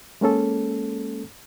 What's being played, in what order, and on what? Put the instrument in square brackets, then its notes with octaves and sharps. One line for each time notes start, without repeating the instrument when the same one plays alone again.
[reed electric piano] G#3 A#3 C#4 A4